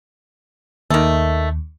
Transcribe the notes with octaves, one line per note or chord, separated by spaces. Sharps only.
D#2 D#3 A3